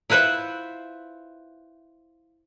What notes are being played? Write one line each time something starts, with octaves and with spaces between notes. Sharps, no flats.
E4 F4 B4 C5 E5 F#5